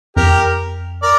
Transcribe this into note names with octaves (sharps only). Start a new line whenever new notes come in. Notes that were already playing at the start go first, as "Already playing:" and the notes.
F2 G4 A#4
A#4 D5